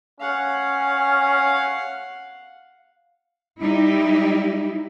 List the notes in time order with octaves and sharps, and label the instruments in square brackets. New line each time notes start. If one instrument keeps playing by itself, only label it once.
[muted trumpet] C#4 [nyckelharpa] F5 F#5
[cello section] G3 D#4 E4 G4